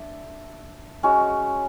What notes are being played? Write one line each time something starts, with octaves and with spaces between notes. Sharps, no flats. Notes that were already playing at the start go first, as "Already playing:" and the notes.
Already playing: D4 A4 E5
G#3 C#4 F#4